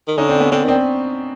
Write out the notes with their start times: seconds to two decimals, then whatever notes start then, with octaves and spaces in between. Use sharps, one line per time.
0.08 D#3
0.18 D3 C#4 D#4
0.29 C4 D4
0.40 B3 C#4
0.52 D3 C4 D4
0.64 D#3 C4 D4